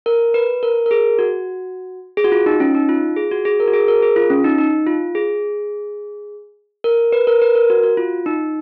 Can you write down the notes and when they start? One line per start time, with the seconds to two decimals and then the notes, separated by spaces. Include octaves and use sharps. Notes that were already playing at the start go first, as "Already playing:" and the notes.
0.06 A#4
0.34 B4
0.63 A#4
0.86 A#4
0.91 G#4
1.19 F#4
2.17 G#4
2.24 F#4
2.32 F4
2.46 D#4
2.60 C#4
2.75 D#4
2.89 F4
3.16 G#4
3.31 F#4
3.45 G#4
3.60 A#4
3.68 F#4
3.73 G#4
3.88 A#4
4.02 G#4
4.16 F4
4.30 C#4
4.44 D#4
4.58 D#4
4.87 F4
5.15 G#4
6.84 A#4
7.12 B4
7.27 A#4
7.42 B4
7.55 A#4
7.70 F#4
7.83 F#4
7.97 F4
8.26 D#4